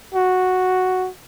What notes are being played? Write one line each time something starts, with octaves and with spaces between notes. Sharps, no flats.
F#4